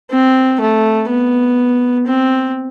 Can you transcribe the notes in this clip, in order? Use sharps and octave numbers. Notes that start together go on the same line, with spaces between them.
C4
A3
B3
C4